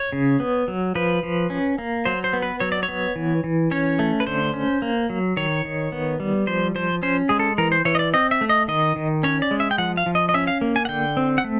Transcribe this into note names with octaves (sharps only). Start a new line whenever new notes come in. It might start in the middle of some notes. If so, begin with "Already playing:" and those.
Already playing: C#5
C#3
B3
F#3
F3 B4
F3
C#4
A#3
F#3 C5
C5
B3
B4
F#3 C#5
D5
C#5
B3
E3
E3
C#4 C#5
A3
B4
D3 C5
C#4
A#3
F#3
D#3 C#5
D#3
B3
G3
F3 C5
F3 C5
C#4 C5
G#3 G#4
A4
E3 A#4
C5
E3 C#5
D#5
D5
C4 D#5
E5
A3
D#5
D#3 D#5
D#3
C#4 C#5
D5
G#3
E5
G5
F3 F#5
F5
F3
D#5
D#5
C#4 E5
F5
A#3
G#5
F#5
D3 G5
C4
F#5
A3